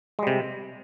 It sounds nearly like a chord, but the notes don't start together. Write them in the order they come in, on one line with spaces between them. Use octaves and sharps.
G#3 G3 C3